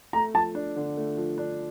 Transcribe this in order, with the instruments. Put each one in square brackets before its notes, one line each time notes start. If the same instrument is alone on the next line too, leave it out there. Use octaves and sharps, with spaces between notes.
[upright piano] A3 [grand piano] A#5
[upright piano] F3 [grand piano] A5
[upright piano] D4
D3
A3
F3
D4